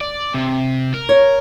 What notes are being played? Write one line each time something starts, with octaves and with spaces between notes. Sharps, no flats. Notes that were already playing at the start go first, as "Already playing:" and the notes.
D5
C3
A#4
C#5